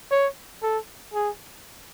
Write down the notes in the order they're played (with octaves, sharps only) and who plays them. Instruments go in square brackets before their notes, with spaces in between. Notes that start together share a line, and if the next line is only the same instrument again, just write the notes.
[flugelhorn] C#5
A4
G#4